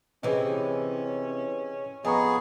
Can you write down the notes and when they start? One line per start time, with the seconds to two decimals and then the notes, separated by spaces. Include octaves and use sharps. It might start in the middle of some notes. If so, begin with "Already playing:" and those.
0.23 C3 E3 C#4 G#4 C#5 D#5
2.05 F2 B3 G#4 D#5 A#5 C#6